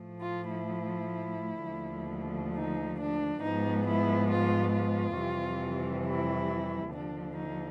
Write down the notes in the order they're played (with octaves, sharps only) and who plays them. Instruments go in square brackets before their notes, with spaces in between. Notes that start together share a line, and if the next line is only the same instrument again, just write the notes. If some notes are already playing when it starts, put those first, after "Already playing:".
Already playing: [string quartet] A2 F3 A3
F4
E4
D#2 D3 F3 A3
D#4
D4
G#2 F3 G#3 B3 D#4
E4
F4
F4
F2 C3 E3 G3
E4
D#2 D3 F3 D4
D#4